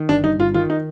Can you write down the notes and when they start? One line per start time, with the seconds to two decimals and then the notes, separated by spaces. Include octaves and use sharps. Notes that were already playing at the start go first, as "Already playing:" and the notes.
Already playing: D#3
0.09 G1 D4
0.24 G2 D#4
0.39 G1 F4
0.54 D#3 F4
0.70 D#4